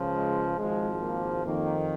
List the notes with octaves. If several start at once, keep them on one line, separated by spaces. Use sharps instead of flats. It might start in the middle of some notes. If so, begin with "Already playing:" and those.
Already playing: C#2 C#3 F3
G#3
G#1 G#2 F3 G#3
A#3
F2 D#3 A#3